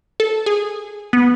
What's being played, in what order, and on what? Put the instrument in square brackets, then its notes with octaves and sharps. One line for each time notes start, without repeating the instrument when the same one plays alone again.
[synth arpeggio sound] A4
G#4
B3